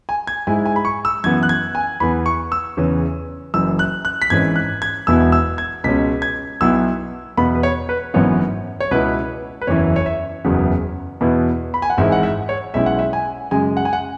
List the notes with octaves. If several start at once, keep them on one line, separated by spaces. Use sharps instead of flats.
G#5
G#6
G#2 G#3 E4 G#5
G#5
B5
C#6
E6
F#2 E3 B3 G#6
F#6
G#6
G#5
E2 E3 B3 B5
C#6
E6
E2 C#3 E3 C#4
F#1 F#2 E3 E6
F#6
F#6
B6
G#1 G#2 E3 C#4 G#6
F#6
G#6
E1 E2 B2 B3 E4 E6
E6
G#6
C#2 B2 G#3 C#4 B6
G#6
B1 B2 F#3 B3 E4 E6
E2 B2 B3 B5
B4
C#5
B4
G#1 F#2 E3 B3 C#5
C#5
C#2 B2 B3 E4 B4
B4
F#1 E2 E3 C#4 E4 C#5
C#5
E5
F#1 E2 C#3 F#3 B3
E2 B2 B3 E4
B5
G#5
F#5
G#1 G#2 E3 G#3 E4 E5
F#5
E5
C#5
B1 B2 G#3 C#4 E4 E5
F#5
E5
G#5
F#2 C#3 G#3 G#5
F#5
G#5
F#5